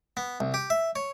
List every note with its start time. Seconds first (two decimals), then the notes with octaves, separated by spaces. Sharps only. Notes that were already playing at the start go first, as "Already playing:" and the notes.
0.17 B3
0.40 C2
0.54 G4
0.70 E5
0.96 C#5